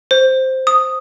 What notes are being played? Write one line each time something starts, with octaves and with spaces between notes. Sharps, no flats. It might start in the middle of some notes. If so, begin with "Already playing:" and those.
C5
D#6